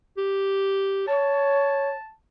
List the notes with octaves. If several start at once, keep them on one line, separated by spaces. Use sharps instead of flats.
G4
C#5 A5